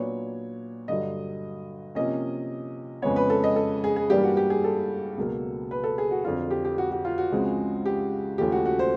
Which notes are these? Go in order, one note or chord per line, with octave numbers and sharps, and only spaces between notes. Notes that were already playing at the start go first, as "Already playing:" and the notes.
Already playing: A#2 F#3 B3 D4 C#5
G2 D3 F#3 D#5
C3 F3 A#3 C#4 D#5
F2 C#3 F3 G#3 B3 C#5
B4
A4
D#5
A4
G#4
G#4
G2 E3 G3 A#3 D4 G4
F#4
G4
G#4
A4
C#2 B2 F#3 A#3
B4
A4
G#4
F#4
F2 D3 F#3 F4
G4
G4
F#4
F#4
F4
F#4
C#2 C#3 F3 G#3 C4
G4
D#2 C#3 F3 A3 G4
F#4
F#4
C5